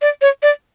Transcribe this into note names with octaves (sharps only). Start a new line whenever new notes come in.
D5
C#5
D5